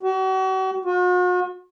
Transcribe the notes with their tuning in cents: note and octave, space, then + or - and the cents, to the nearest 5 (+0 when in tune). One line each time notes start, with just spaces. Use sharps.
F#4 +40
F#4 -45